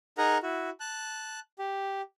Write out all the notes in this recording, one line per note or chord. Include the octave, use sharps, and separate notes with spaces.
D#4 G#4 A#4 F#5 A#5
E4 F#4
A5 F#6
G4